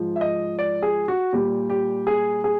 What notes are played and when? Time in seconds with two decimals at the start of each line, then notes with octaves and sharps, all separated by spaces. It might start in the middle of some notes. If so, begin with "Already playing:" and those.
Already playing: G#2 F3
0.16 E5
0.21 D#5
0.59 D5
0.83 G#4
1.08 F#4
1.33 A#2 G3 G4
1.70 G4
2.07 G#4
2.44 G#4